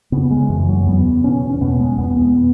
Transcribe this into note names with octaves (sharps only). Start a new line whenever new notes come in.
C#3 B3
G#3
F#2 E3
F#3
E2 B3
B2 C#4
C#4
B2 B3
G#3
E2 B3
B3